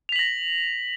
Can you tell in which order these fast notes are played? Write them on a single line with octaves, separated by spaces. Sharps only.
F7 B6 F#7 A#6